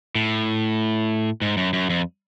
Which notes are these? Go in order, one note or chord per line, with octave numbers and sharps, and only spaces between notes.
A2
G#2
F#2
F#2
F2